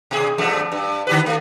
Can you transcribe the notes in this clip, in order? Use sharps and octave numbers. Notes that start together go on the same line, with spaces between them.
B2 G#4
E2 G2 A3
G2
D3 G4 B4
A3